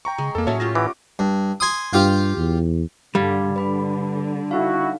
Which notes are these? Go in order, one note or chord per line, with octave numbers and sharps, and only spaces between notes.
G5 A#5 C#6
C#3 G#3
F2 A#3 A4
A2 F#3 C#4 G#4 C#5 E5 A5
A3 F4 G4 A#6
E3 F#5 D6
G2
G#5 C6 D#6
G2 F4 G4 F5
E2
G2 D3 G3 F5 G#6
D3 B4 B5 D6
D#4 E4 F#4 F5